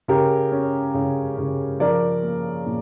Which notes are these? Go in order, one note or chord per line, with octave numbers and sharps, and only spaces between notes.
C#3 G4 A#4
C#4
C#3
C#3
F3 A#4 D5
A#3
A#2